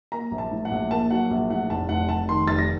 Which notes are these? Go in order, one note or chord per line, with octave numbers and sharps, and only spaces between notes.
A#3 A#5
A#1
A5
A2
F#5
A#1
A#3 A5
F#3 F#5
A#1
A2 F#5
F1 A5
F1 F#5
F1 A5
D#3 C6
F1 A6
A#6